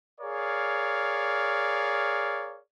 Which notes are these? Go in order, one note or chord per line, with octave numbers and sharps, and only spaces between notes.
G#4 A#4 C#5 D5 F5